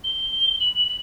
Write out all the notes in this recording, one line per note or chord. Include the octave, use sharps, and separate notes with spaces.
G7
F#7
F#7